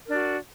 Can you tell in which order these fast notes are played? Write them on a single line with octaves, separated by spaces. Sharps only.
A#4 D4 F#4